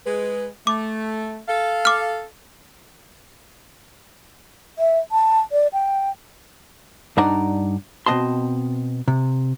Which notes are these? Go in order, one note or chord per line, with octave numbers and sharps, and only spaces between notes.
G#3 B4
A3 D6
A4 F5
D6 F6
E5
A5
D5
G5
G2 D4 D#4 D5 F#5 A#5
B2 C4 C5 D#5 A5 C6
C3